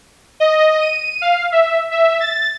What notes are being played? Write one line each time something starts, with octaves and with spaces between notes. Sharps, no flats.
D#5
D#7
F5
E5
E5
A6